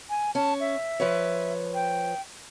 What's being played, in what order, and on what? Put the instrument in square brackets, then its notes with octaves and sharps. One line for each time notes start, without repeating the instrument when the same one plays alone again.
[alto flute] G#5
[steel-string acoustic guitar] C#4 [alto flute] A5
[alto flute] E5
[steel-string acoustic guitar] F3 B4 C#5
[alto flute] G5